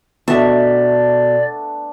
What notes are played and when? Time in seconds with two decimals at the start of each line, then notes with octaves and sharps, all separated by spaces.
0.28 B2 A3 B3 D4 D5 E5